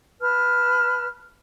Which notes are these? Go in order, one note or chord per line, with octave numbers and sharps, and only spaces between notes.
B4 A5 F6